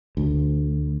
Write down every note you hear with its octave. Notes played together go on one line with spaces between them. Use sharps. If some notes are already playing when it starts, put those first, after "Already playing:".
D2